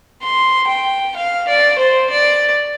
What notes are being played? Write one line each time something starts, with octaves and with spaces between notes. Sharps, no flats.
C6
G5
F5
D5
C5
D5